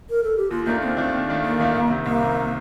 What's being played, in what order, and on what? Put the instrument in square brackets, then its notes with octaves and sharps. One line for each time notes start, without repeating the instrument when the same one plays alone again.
[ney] A#4
A4
G4
[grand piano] D#2 [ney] F4
[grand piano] D#3 A3 D4 F4 [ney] A#3
[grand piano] D#2 [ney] C4
[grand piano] D#3 A3 D4 F4
D#2
D#3 A3 D4 F4
[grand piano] D#2 [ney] A#3
[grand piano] D#3 A3 D4 F4
C2
C3 D#3
[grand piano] C2 [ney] A#3
[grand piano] C3 D#3